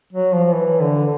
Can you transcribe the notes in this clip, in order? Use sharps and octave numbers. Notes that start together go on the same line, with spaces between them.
F#3
F3
E3
D3